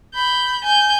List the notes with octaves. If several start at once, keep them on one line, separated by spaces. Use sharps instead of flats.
B5 G6
G#5 G6